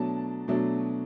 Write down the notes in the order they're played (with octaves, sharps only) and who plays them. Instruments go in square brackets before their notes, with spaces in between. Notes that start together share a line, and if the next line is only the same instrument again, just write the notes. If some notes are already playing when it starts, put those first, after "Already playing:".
Already playing: [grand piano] B2 F#3 A3 D4 A5
B2 F#3 A3 D4